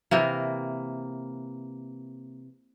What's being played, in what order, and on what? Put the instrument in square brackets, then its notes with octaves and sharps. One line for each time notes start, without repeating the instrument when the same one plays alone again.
[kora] C3 E3 A#3